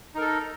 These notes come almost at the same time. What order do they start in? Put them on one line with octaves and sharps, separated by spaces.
D#4 A#4 A4